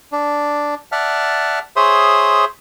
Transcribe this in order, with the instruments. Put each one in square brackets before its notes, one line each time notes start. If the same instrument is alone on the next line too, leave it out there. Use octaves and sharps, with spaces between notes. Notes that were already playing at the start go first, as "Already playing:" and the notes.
[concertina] D4
D5 E5 F#5 A5 F6
G#4 C5 C#5 E5 C6 D#6